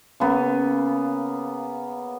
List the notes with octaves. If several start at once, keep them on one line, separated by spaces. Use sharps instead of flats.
C#3 A#3 B3